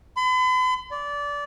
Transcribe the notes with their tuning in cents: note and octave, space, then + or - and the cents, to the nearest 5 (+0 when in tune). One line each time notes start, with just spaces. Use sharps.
B5 +45
D5 -20